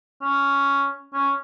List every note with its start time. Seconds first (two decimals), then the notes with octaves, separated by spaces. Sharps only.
0.22 C#4
1.14 C#4